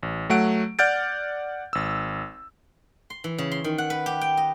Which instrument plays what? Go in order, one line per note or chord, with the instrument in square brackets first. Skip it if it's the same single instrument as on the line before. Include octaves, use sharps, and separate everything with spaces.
[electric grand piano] A1
F#3 A3 F#5 D7
D5 F#5 F6 G6 A6 D7
G#1 E6
[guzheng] C6
E3
C#3
C6
D#3
F#5
B4
G4
G5
D#5